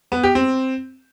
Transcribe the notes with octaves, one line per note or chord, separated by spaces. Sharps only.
B3
G4
C4